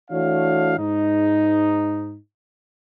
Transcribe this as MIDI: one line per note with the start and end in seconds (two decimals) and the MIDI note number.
0.10 0.74 52
0.10 0.74 57
0.10 0.74 62
0.10 0.74 66
0.10 0.74 73
0.10 0.74 77
0.79 2.17 44
0.79 2.17 63